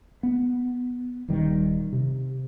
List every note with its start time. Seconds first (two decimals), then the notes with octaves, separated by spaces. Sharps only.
0.23 B3
1.28 D#1 D#2 D#3 G3
1.93 C3